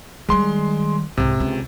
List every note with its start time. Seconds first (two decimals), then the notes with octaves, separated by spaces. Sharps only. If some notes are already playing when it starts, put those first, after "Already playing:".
0.29 D#3 G3 G#3 C6
1.17 C2 G#2 C3
1.40 C#2